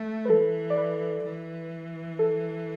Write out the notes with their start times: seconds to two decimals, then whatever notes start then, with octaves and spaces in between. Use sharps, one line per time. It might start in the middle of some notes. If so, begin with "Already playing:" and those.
Already playing: A3
0.25 B4
0.30 E3 A4
0.70 D5
0.77 B4
1.24 E3
2.19 A4